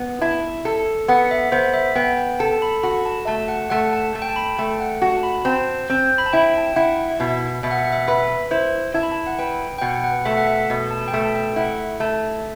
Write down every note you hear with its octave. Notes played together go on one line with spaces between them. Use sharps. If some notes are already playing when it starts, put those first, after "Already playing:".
Already playing: B3
E4 A5
A4
B3 F#5
E5
B3 C5
E5
B3 G5
G5
A4 A5
B5
F#4 B5
A5
A3 A5
F#5
A3 F#5
A5
A3 A5
G5
A5
B5
A3 G5
F#5
F#4 A5
A5
B5
C4 A5
C4
B5
A5
E4 G5
A5
G5
E4 F#5
B2 E5
B2 E5
F#5
E5
F#5
E5
B4 E5
E4 C5
E4 A5
B5
A5
F#5
B4 G5
G5
B2 F#5
F#5
A3 E5
F#5
E5
B2
A5
G5
A3 A5
A5
G5
E4 F#5
A3